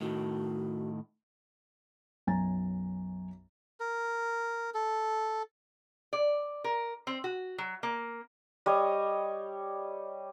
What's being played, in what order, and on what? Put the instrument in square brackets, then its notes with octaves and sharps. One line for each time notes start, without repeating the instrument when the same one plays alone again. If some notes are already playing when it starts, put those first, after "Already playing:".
[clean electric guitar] A2 D#3 [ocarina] F#4
[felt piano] B1 F#2 G#5 A#5 A6
[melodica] A#4
A4
[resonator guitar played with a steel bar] D5
A#4
C4
F#4
F#3
A#3
[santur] G3 C#5 D#5